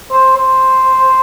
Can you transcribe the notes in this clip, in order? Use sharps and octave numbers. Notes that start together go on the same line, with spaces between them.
C5
C5